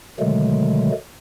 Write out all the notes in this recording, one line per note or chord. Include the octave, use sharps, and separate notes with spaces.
B2 D3 D#3 F#3 G#3 A3